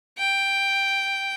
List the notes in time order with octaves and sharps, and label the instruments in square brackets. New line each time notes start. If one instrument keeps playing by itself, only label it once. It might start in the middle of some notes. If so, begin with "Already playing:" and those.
[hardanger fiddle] G5